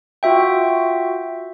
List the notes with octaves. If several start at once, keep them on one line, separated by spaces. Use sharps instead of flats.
F4 F#4 E5 G5